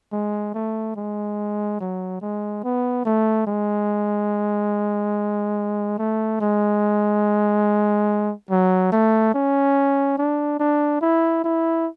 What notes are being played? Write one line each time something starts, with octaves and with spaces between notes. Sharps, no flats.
G#3
A3
G#3
F#3
G#3
B3
A3
G#3
A3
G#3
F#3
A3
C#4
D4
D4
E4
E4